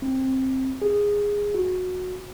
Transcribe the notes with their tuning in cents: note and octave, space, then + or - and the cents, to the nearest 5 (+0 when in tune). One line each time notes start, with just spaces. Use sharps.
C4 +10
G#4 -15
F#4 -15